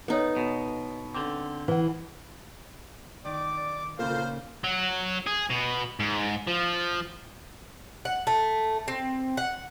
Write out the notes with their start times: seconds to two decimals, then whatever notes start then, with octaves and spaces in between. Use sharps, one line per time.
0.08 B3 D#4 A4 B4 C#5
0.37 B2
1.15 D3 C4 D6
1.68 E3 B4 F#5
3.25 D#3 D5 D6
3.57 D5
3.99 A#2 C#3 F4 A4 A#4 C5 F5
4.64 F#3
5.27 G#4
5.50 B2
6.00 G#2
6.47 F3
8.05 F#5
8.27 A3
8.88 C4
9.37 F#5